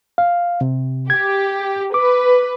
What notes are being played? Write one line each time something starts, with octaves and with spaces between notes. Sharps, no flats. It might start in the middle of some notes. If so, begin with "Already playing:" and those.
F5
C3
G4 G#6
B4 D6